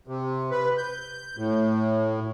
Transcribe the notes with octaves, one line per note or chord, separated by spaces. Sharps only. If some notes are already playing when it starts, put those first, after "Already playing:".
C3
B4
G6
A2